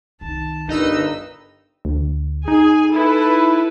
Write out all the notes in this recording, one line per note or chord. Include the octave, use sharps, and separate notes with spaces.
C2 D#3 A5
G1 G2 D3 D#4 A#4 B4 D#5 E6
D2
D#4 G#4 G#5
E4 A4 B4